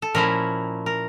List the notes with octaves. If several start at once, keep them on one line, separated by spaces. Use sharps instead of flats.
A4
A#2 F3 C#4 E4 A#4
A#4